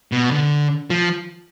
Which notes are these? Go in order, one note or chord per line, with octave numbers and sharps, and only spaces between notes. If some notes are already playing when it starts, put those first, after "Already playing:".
B2
D3
F3